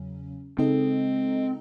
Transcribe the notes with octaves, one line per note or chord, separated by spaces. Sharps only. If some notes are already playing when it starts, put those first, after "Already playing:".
Already playing: E2 C#3 F#3 C#4
C#3 G#3 C4 D#4 A4 D#5